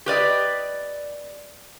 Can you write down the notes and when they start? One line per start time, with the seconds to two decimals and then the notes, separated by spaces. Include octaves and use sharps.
0.06 G4 B4 D5 D#5